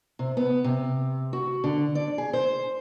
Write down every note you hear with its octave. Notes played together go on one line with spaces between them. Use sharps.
C3
B3
C3
F#4
D3
D5
G#4
C5